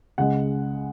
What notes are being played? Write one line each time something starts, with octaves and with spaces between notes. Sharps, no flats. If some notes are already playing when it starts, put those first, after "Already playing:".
C#2 C#3 G#3 F#5